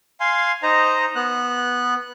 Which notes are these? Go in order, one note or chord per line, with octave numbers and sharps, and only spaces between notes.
F5 G#5 C6
D#4 C5 D#5 A#5
B3 F#6